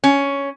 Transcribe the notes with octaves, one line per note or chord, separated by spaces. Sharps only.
C#4